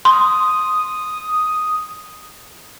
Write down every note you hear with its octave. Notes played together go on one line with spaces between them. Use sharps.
C6 D#6